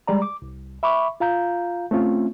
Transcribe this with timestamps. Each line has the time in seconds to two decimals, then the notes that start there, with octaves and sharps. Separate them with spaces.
0.07 G3 G#3 D5 A#5
0.22 D6
0.42 C2
0.83 E5 B5 C#6 D6
1.20 F4 F5 A#5 G6
1.91 A3 C4 C#4 F4